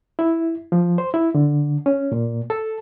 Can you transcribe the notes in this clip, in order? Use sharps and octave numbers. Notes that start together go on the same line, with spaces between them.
E4
F3
C5
E4
D3
C#4
A#2
A4